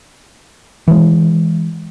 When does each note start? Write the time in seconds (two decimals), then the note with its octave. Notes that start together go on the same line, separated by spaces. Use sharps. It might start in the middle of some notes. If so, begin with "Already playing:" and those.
0.88 E3 G#3